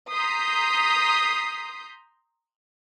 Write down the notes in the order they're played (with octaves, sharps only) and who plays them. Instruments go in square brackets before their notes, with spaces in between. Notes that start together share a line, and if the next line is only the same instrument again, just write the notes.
[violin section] A#5 C6 D#6 G6 B6 C7